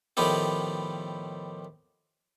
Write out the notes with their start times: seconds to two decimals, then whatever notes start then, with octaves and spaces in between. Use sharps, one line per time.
0.17 A2 D#3 F3 A3 B3 G4